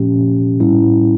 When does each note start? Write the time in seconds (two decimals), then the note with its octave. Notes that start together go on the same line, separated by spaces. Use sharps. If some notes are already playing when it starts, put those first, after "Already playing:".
Already playing: A#2 F3 A3 C#4 G4
0.60 A2 G3 C#4 E4